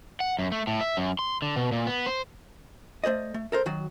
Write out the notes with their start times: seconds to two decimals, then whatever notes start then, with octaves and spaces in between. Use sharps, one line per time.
0.20 F#5
0.39 F#2
0.52 A3
0.67 A2
0.81 E5
0.97 F#2
1.19 C6
1.42 D3
1.56 B2
1.72 A#2
1.87 B3
2.06 C5
3.04 A3 C5 D5 D#5
3.34 A3
3.52 A4 A#4 C5
3.66 D#3 F#3 F#4